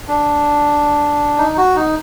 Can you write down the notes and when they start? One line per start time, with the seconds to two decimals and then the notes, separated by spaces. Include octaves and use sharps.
0.08 D4
1.38 D#4
1.57 F#4
1.76 D#4